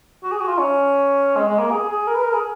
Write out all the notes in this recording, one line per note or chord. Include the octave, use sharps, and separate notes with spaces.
F#4
G#4
F#4
F4
C#4
G#3
G#3
A#3
G#4
G#4
A#4
B4
A#4
G#4